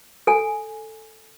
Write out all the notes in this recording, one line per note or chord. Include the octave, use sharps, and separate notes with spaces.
A4 G#5